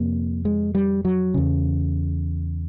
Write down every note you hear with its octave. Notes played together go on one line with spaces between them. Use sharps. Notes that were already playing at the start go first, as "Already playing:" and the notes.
Already playing: F2 C3 A#3
G#3
G3
F#3
E2 C#3